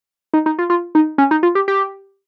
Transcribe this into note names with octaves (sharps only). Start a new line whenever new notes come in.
D#4
D#4
F4
F4
D#4
C#4
D#4
F4
G4
G4